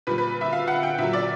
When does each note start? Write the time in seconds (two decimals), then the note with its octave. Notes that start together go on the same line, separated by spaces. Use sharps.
0.07 A#2 G3 B4
0.18 B4
0.41 E5
0.53 F5
0.68 F#5
0.83 G5
0.98 A#2 F#3 E5
1.13 D5